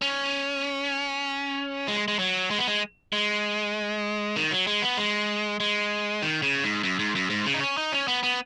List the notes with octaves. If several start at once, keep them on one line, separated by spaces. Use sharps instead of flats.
C#4
G#3
G#3
F#3
G#3
B3
G#3
G#3
D#3
F#3
G#3
B3
G#3
G#3
D#3
C#3
G#2
F#2
G#2
F#2
G#2
C#3
D#4
C#4
D#4
C#4
B3
B3